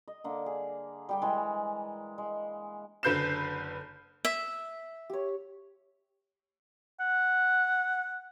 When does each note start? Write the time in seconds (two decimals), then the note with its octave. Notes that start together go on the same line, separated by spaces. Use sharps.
0.08 D#5
0.24 D3 A#3
0.46 G#4
1.09 G3 G4 G5
1.22 E3 G#3
2.18 G#3
3.03 F#1 D3 B4 G6 C7 E7
4.25 E5
5.10 G4 C#5
7.00 F#5